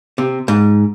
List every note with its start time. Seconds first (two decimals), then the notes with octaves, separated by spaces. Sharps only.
0.18 C3
0.48 G#2